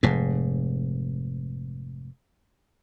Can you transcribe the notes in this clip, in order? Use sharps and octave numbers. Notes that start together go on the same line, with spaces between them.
F1 G#2